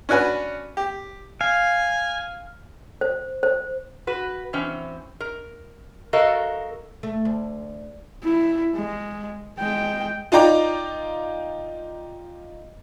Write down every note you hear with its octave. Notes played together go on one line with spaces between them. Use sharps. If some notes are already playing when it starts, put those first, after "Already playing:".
C#4 D4 F#4 B4 G#5
G4
F5 G#5
C5
C5
F#4 B4
E3 C4 C#4
A#4
F#4 A4 A#4 D#5 F5
A3
D2
E4
G#3
G#3 G5
D#4 F4 D5 G5 A#5 D6